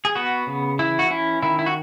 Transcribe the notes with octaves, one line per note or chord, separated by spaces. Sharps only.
G#4
B3 F#4
C#3
E3 E4
F#4
C#4 E4
D#3 E4
E4
F#4